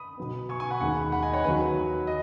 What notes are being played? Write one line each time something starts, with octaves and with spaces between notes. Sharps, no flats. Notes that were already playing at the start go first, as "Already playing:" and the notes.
Already playing: B5 D#6
B2 F#3 B3
G#5 C#6
G#5 C#6
F#5 B5
D#2 D#3 G#3 F#5 B5
F#5 B5
D#5 G#5
C#5 F#5
D#2 D#3 F#3 B4
D#5